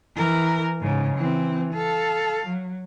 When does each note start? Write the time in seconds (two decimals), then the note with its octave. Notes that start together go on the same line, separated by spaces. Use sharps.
0.15 E3 A#4
0.81 G#2 C#3
1.17 E3 C4
1.73 A4 F5
2.46 F#3